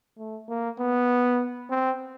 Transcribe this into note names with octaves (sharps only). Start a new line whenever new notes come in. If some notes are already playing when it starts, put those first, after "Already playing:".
A3
A#3
B3
C4